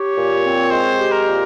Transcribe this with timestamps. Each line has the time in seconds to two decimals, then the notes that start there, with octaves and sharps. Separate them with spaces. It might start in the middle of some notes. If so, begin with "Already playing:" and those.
Already playing: G4 C#5
0.14 A#2
0.43 C4
0.70 G#3 C5
0.98 G4
1.12 A#4
1.27 A#2